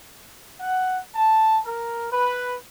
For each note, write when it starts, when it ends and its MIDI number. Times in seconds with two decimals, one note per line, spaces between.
0.61 0.98 78
1.15 1.59 81
1.65 2.10 70
2.12 2.54 71